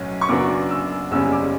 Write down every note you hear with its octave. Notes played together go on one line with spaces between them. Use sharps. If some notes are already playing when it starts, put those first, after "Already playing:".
Already playing: B1 A2 F#3 C#4
C#6
F#2 C#3 F#3 B3 D4 D6
E6
F#1 E2 C#3 G3 C#4 E6
D6